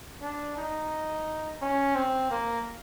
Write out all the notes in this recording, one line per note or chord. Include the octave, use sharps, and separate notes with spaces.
D4
D#4
C#4
C4
A#3